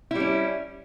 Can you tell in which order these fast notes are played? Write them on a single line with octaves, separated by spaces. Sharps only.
E4 G3 C#4